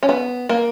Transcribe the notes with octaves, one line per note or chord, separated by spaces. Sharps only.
C#4
B3
A#3